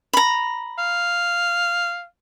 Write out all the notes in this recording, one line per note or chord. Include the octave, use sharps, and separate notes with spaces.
A#5 B5
F5